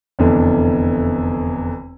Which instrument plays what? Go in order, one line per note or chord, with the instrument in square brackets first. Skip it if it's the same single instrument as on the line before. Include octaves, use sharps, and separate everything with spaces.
[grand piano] F1 E2 D3